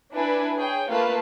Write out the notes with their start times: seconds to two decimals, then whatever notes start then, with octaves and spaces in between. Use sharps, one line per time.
0.12 D4 E4 B4 G#5
0.57 G#4 C#5 G5
0.88 A3 A#3 F4 B4 F5 A5